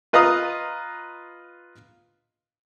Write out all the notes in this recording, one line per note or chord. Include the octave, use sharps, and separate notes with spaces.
F4 B4 D#5 F5 A#5 D#6